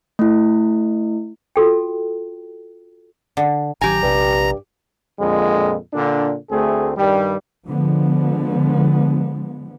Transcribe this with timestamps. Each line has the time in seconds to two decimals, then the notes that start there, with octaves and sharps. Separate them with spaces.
0.19 A3 E4
1.56 F4 F#4 A4 G5
3.37 D3
3.81 A1 D#3 F#3 G4 G#5 A#5
4.02 A#1 G2 C3
5.20 F2 A#2 D3 G#3
5.94 A#2 D3 D4
6.51 D2 A3 C4 G#4
6.97 G2 D#3 G3
7.68 D3 F3 G#3 B3